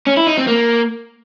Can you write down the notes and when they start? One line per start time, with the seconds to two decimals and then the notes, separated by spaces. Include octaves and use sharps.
0.07 C#4
0.17 E4
0.27 D#4
0.37 C4
0.47 A#3